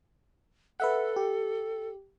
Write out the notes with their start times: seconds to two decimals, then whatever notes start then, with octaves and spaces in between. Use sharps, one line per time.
0.80 A4 B4 E5 F#5
1.16 G4